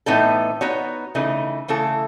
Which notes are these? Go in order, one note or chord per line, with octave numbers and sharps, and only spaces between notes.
A2 E3 B3 D#4 A4
B3 D#4 F#4 C#5
C#3 E3 A3 D#4
C#3 E3 A3 E4 A4